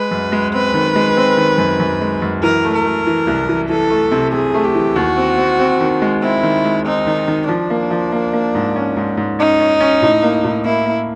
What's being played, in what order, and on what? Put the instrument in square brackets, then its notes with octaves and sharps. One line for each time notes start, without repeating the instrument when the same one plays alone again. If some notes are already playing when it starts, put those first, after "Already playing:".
Already playing: [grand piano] G#3 [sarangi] B4
[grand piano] F#2
G#3
[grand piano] C4 [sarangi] B4
[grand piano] D#3
G#3
C4
D#3
F#2
F#2
G#3
F#2
[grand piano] E3 [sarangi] A#4
[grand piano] A3
[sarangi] A#4
[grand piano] A3
E3
C2
E3
[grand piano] E3 [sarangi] A4
[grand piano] A3
C3
[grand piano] C3 [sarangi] G#4
[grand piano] A3
[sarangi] G4
[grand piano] E3
[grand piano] D#2 [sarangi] F#4
[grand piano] C4
C4
C4
D#3
G#3
[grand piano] C4 [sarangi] E4
[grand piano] D#3
G#3
[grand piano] C4 [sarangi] D#4
[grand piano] D#3
D#3
[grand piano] F3 [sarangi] D4
[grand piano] A#3
F3
A#3
A#3
G#2
C#4
G#2
G#2
[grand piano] C#4 [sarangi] D#4
[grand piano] C#4
C#4
A2
A#3
A2
[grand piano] A#3 [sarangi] E4
[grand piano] A#3